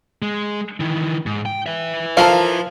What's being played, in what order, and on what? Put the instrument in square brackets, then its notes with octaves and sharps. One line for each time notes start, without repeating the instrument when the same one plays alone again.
[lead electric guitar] G#3
D#3 E3
G#2
G5
B4 E5
[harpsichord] F3 [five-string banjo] A4 A#4 F5